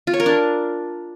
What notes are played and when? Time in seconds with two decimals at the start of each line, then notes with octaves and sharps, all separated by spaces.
0.07 F4
0.13 C#5
0.20 A#4
0.26 D4